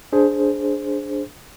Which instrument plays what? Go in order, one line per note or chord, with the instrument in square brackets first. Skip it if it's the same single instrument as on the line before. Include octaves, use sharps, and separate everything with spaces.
[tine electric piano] D4 G#4 C5